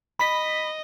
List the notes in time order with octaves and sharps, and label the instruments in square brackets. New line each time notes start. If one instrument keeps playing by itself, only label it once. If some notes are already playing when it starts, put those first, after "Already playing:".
[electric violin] D#5 [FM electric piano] B5 B6